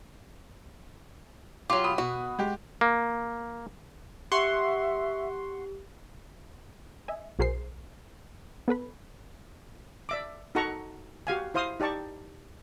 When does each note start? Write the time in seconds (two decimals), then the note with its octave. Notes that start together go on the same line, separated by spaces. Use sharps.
1.70 F#3 F4 G4
1.84 B5 D#6
1.98 B2 F#4
2.39 G#3 G4
2.81 A#3
4.32 G4 E5 F#5 C6 C#6
7.08 D#5 E5 G#5
7.39 B1 F#4 G#4 A#4 C5 C7
8.68 B3 A4 B4 B5
10.09 D5 E5 D6
10.55 D#4 F#4 A4 F#5 A#5 C#6
11.27 F#4 G4 F5 G#5
11.54 E4 C5 F5 C6 D#6
11.80 D#4 G4 D5 A5 C#6